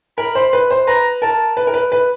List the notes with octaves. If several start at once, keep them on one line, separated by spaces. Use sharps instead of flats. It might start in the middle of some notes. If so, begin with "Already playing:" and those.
A#4 B5
C5
B4
C5
B4 A#5
A#4 A5
B4
A#4
B4
B4